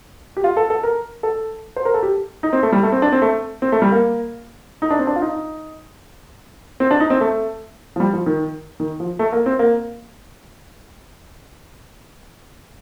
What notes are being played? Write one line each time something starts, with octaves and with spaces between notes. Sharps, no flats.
G4
F4
A4
A4
A#4
A4
C5
A#4
A4
G4
D#4
C4
A3
G3
A3
C4
D4
C4
A3
C4
A3
G3
A#3
D#4
D4
C4
D4
F4
D#4
C4
D4
D#4
C4
A3
F3
G3
F3
D#3
D#3
F3
A3
A#3
C4
A#3